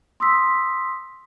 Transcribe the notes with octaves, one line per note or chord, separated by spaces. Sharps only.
C6 D#6 E6 B6